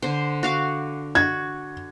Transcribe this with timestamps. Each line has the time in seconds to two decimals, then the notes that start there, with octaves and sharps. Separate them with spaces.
0.02 D3 C5
0.43 F#4 F5 D6
1.15 F#4 G#6